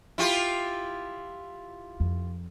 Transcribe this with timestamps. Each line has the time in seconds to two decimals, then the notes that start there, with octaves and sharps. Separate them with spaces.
0.18 E4 F4 G4
2.00 F2